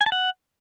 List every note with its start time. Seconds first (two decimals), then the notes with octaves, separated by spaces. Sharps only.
0.01 G#5
0.06 A5
0.12 F#5